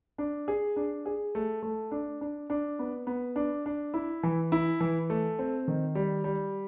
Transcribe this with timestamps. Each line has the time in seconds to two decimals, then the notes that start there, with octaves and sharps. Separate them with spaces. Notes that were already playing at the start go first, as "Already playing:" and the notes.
0.18 D4
0.48 G#4
0.76 D4
1.06 G#4
1.35 A3
1.63 A3
1.91 D4
2.21 D4
2.50 D4
2.79 B3
3.07 B3
3.36 D4
3.66 D4
3.94 E4
4.23 E3
4.52 E4
4.81 E3
5.10 A3
5.39 C4
5.68 D#3
5.95 G3
6.24 G3